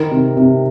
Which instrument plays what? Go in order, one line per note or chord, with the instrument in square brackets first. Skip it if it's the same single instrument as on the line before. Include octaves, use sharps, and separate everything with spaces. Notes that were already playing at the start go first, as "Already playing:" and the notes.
Already playing: [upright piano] D#3 A#4
C3
C3